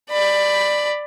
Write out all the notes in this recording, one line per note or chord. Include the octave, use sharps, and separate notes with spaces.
D5 B5